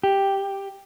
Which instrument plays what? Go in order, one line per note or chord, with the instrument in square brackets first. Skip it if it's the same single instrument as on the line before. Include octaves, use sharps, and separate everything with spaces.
[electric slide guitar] G4